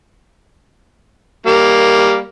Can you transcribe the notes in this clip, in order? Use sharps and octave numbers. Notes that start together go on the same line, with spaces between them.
G3 A#3